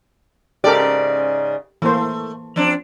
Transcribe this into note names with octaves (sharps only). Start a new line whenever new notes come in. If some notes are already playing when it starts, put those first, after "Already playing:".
G#2 C#3 G4 A4 A#4 D5
E3 A3 A#3 C5
F3 C4 D4